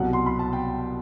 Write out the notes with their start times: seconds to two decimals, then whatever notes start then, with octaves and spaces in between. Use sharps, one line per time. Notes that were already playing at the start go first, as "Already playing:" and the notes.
Already playing: C2 B2 F#3 F#5
0.13 C6
0.26 B5
0.39 A5
0.53 G5